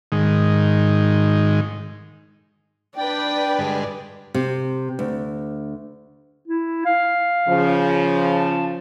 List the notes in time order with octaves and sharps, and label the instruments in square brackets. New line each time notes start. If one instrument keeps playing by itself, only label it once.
[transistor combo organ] G#2 D#3
[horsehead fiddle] D4 [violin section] B4 D5 [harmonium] G5
[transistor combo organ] G2 D3 G#3
[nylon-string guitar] C3
D2
[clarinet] E4
F5
[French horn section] C#3 F3
[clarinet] A5